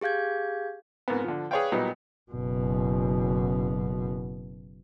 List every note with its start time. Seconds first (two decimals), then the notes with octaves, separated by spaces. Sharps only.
0.01 G4 G#4 F5 G6 G#6
1.08 F2 G#2 A#3 B3
1.24 D3 F3
1.51 G#4 B4 C#5 D5 F5 G5
1.72 A#2 F#3 G3 B3 D#4
2.32 F#1 B2